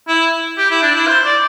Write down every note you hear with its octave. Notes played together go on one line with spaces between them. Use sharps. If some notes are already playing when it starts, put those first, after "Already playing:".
E4
G4
E4
D4
E4
C5
D5